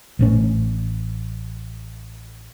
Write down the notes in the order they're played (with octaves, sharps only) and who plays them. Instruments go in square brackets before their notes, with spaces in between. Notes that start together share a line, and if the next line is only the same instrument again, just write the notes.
[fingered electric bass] A1 A2 C#4